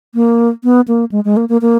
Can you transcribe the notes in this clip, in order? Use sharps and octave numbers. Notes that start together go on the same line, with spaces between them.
A#3
B3
A#3
G#3
G#3
A#3
A#3
A#3